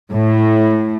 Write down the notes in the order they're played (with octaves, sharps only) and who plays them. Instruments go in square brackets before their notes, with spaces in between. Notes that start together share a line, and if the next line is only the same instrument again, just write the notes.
[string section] A2